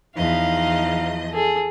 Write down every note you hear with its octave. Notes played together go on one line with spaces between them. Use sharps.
E2 F3 D#4 D#5 F5
G#4 A4